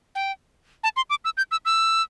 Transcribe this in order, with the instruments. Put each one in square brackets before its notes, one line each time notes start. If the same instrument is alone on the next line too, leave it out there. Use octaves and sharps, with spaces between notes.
[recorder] G5
A5
C6
D6
E6
G6
E6
E6